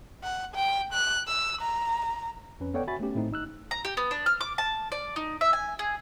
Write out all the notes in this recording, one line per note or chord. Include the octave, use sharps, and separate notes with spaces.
F#5
G5
F#6
E6
A#5
F2 C#4 B4
B3 A4 C#5 D5 F#5 G5
F#4 E5 G#5 B5 A6
A3 B3 C#4 G4
A2 A3 C4 D#4
G#1 D#4 E6 F#6
A#5
G4
B3
D4
F6
D6
A5
D5
D#4
E5
G#5
G#4